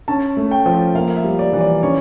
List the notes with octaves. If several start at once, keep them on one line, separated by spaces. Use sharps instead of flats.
C#4 A5
A3
G5
F3
A#3 F5
E5
G3
D5
E3
D5
C#4 C#5